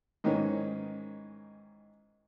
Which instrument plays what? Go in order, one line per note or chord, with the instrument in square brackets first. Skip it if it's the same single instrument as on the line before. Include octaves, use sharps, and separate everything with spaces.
[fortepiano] G#2 D#3 E3 C#4